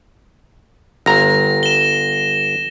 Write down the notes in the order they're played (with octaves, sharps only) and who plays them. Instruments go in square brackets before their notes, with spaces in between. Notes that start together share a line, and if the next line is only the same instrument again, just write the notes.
[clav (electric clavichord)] G1 A#5 [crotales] A#6
[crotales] E7 G7